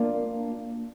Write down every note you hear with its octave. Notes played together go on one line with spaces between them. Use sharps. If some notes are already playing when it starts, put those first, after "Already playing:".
Already playing: A#3 D4 F4